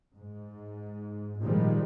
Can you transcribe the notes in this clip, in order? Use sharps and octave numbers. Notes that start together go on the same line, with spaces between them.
G#2
A#2 D#3 F3 G3 G#3